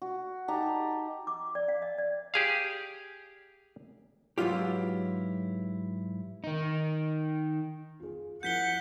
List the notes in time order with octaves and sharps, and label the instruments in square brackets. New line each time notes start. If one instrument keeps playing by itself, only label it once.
[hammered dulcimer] F#4
D#4 G4 A5 A#5
[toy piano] D6
D5
F5
D#5
D5
[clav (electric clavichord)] G4 G#4 F5
[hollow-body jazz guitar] G#2 E3 F#3 E4 F4 G4
[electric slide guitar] D#3 D#4
[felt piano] F4 G#4
[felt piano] F3 E4 A#4 [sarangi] F#5 [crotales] G6 B6 G7